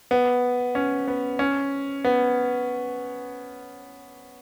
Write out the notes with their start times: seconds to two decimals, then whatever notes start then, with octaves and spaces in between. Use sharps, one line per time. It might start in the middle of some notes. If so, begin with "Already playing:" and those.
0.11 B3
0.75 C#4
1.08 B3
1.39 C#4
2.05 B3